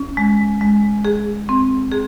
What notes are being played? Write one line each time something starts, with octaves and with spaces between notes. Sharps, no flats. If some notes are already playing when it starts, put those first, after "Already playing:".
Already playing: C#4
G#3
G#3
G#4
C4
G#4